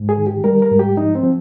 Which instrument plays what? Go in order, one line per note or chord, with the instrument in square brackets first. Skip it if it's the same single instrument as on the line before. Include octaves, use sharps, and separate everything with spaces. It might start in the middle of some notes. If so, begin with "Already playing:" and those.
Already playing: [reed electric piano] G#2
G#4
D#3
G4
G3 A#4
A#4
G#2
G4
F3 D#4
C4
F3